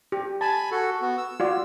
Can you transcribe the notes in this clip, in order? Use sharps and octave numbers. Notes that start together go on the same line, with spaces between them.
G4
G#5 A5 B5
F#4 A4
B3 F#4
E6
F4 F#4 D5